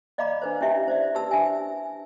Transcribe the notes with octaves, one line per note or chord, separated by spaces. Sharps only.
D5 D#5 F5 A#5 B5 D6
D4 B4 C5
C#4 D4 E4 G4 E5
C5 D5 E5
G4 B4 A5 E6
D4 E5 G#5